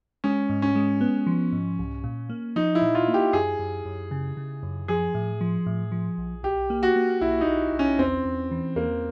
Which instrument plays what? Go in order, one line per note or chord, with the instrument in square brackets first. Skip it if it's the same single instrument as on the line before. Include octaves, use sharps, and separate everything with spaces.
[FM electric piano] G#3 [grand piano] C#4
[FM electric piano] G#2
[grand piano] C#4
[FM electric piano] G#3
B3
F3
G#2
C2
A#2
A#3
[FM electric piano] F3 [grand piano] D#4
[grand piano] E4
[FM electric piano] A#2
[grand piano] F4
[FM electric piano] A#3
[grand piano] G4
[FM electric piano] F#2 [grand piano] G#4
[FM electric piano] F#2
F#2
C#3
C#3
F#2
[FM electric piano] F3 [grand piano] G#4
[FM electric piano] A2
F3
A2
F3
A#1
[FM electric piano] B1 [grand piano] G4
[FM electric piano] A#3
[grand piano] F#4
[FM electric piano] A#3
[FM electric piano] B1 [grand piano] E4
[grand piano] D#4
[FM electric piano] B1
B1
[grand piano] C#4
[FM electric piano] E2 [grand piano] C4
[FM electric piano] E2
E3
[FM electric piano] E2 [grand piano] A#3